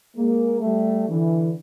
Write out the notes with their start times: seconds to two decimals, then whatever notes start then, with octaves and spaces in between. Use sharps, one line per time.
0.14 G#3 A#3
0.61 G3 A3
1.07 D3 E3